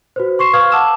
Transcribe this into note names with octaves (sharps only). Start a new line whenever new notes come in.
F#4 B4 C5
C6 C#6 C7 E7
B4 F5 C#6 D#6 F6 G#6
F#5 A5 D6 E6 E7